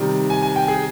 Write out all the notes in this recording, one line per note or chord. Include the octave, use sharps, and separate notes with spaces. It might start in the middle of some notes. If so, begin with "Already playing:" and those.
Already playing: C3 D#3 G3
G#5
G#5
G5
G#4